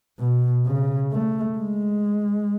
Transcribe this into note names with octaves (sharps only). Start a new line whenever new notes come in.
B2
C#3
A3
G#3